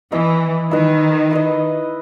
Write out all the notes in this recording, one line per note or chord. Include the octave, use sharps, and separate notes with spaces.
E3 E4 B4 D#5
D#3 E4 B4 D#5
E4 B4 D#5